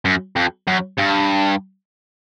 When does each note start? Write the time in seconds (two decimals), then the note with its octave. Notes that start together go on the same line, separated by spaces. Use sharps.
0.05 F#2
0.36 F2
0.67 F#2
0.98 G2